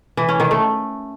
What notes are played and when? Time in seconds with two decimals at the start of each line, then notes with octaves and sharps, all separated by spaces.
0.17 E3
0.29 C#4
0.40 D#3
0.51 A3